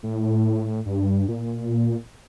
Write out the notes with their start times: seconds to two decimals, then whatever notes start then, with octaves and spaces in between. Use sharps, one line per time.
0.03 A2
0.86 G2
1.28 A#2